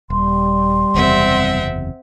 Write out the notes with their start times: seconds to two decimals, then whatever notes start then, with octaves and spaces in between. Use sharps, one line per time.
0.10 D#1 G3 C6
0.95 F#1 E2 C3 C4 E5 F#5